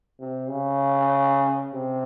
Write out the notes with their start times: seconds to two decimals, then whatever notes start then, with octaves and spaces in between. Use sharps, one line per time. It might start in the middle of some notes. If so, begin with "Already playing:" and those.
0.19 C3
0.49 C#3
1.73 C3